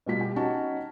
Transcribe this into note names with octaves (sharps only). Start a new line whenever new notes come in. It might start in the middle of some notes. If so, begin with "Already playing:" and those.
B2 G3 F4 B6
G4 G5
C#4 D#4 F#4 C#5 A5